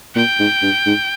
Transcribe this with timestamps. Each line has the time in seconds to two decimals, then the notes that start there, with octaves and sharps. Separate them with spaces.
0.16 A#2 G5
0.39 G#2
0.62 G2
0.86 G#2